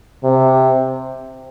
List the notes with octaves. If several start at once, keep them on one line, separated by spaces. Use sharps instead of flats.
C3